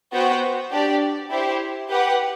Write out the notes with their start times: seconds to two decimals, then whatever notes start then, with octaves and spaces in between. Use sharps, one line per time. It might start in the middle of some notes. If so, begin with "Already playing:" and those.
0.12 B3 F#4 C5 G5
0.71 D4 G4 D5
1.31 E4 G4 C5
1.89 G4 B4 F#5